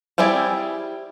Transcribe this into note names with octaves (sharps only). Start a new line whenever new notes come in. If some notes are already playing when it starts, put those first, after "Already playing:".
G3 C4 E4 G#4 D5